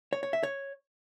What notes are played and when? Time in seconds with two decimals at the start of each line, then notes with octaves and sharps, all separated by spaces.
0.13 C#5
0.23 C#5
0.33 E5
0.43 C#5